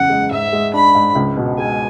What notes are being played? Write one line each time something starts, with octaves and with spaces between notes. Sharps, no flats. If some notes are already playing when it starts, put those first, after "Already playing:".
Already playing: F#1 E2 C#3 F#5
G#3
G#2 E5
G#3
D4 B5
G#2
C#2
B2
G#3 G#5